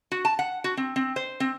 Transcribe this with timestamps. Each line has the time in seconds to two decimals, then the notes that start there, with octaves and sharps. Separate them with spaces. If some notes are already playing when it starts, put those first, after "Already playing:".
0.12 F#4
0.25 A5
0.39 F#5
0.64 F#4
0.77 C4
0.96 C4
1.16 C5
1.40 C4